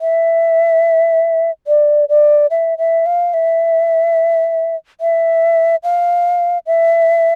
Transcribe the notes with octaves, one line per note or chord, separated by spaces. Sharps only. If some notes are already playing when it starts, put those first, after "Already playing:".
E5
D5
D5
E5
E5
F5
E5
E5
F5
E5